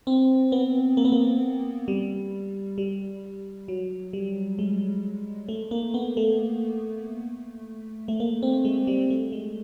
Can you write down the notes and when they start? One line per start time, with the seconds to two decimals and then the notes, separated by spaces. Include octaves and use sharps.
0.07 C4
0.52 B3
0.97 A#3
1.05 B3
1.12 A#3
1.88 G3
2.78 G3
3.68 F#3
4.13 G3
4.59 G#3
5.49 A3
5.71 A#3
5.94 B3
6.17 A3
8.08 A3
8.20 A#3
8.43 C4
8.65 G#3
8.87 G3
9.10 A3
9.32 G#3